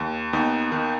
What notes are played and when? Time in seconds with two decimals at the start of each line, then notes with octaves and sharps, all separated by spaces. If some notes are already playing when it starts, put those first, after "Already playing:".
Already playing: D#2
0.33 D#2 B3 D#4
0.72 D#3